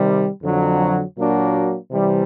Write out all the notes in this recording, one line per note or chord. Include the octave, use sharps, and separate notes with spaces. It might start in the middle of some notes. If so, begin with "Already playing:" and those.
Already playing: C3 D#3 G3
F2 D3 F#3
A#2 F#3 A#3 D4 F#4
C3 E3 G3